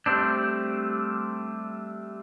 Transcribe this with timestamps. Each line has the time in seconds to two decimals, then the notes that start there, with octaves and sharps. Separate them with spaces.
0.06 G3 A3 C4 D4